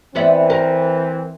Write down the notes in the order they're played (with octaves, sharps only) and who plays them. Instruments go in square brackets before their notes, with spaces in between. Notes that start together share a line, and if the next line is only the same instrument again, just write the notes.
[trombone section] E3 C4 [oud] B3 D5 E5
[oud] A#4